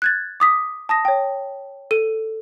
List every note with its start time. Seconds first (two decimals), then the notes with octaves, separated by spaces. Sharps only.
0.02 F#6 G#6 A6
0.40 D6 D#6 B6
0.89 A5 D#6 A#6
1.05 C#5 G5
1.91 A4 D#7